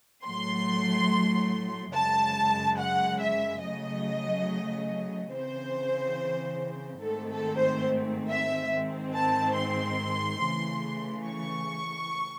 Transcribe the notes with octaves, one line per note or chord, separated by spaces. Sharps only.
A2 F#3 A3 C6
F#2 C#3 G#3 A5
F#5
E5
C#3 F#3 A3 D#5
C#3 E3 C4 C5
G#2 D#3 A3 C4 A4
A4
C5
E5
G#2 D#3 G#3 C4
A5
C6
C#3 E3 A3
C#6